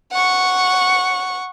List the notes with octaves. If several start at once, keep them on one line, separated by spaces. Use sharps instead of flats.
F#5 C#6